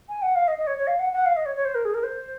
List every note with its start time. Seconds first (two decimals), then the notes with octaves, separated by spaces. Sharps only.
0.09 G#5
0.22 F#5
0.35 F5
0.48 D#5
0.58 D#5
0.67 C#5
0.77 C#5
0.87 F5
0.99 F#5
1.13 F#5
1.25 F5
1.36 D#5
1.45 C#5
1.56 C#5
1.65 C5
1.75 A#4
1.85 G#4
1.94 A#4
2.03 C5